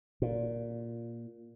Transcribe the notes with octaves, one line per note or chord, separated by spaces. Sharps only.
A#2